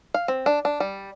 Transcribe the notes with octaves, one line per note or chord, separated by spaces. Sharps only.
F5
C4
D4
D4
G3